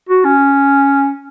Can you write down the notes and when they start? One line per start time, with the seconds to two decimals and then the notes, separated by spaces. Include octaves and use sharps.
0.09 F#4
0.25 C#4